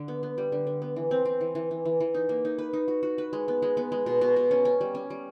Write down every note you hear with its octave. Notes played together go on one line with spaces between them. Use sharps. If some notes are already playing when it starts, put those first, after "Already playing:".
Already playing: D3
B3
B3
G3
D3
D3
B3
E3
C4
C4
E3
E3
E3
E3
E3
D#4
A#3
D#4
B4
D#4
F#4
F#4
B4
G#3
B3
G#3
B3
G#3
B2
B2
B2
C#4
C#4
G3
C#4
G3